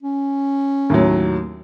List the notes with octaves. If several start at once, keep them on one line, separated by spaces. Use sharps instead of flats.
C#4
D#2 A2 F#3